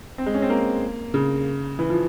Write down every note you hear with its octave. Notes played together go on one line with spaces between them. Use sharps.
C4
G#3
C#4
C4
A#3
C#3
E3
F3